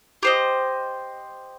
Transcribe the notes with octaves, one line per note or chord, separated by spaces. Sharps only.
G4 C5 D#5